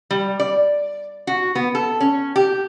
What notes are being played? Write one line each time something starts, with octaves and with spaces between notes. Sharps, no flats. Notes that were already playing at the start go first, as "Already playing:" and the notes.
G3
D5
F#4
B3
A4
C#4
G4